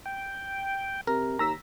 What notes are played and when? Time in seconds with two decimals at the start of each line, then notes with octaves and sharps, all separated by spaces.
0.05 G5
1.07 C3 A#4
1.39 D#2 A#5 E6 B6